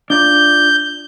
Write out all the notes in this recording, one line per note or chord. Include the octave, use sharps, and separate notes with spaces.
D4 F4 D5 G6